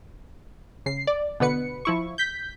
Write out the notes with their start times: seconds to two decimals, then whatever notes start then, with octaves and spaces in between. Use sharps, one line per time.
0.86 C#3 C7
1.07 D5
1.40 B2 D3 B3 B4 C#7
1.85 F3 E4 C#6
2.18 G6 B6